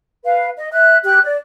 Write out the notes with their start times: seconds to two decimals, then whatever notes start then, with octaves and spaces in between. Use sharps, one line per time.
0.24 B4 F5
0.58 D#5
0.72 E5 F#6
1.04 G4 F#6
1.24 D5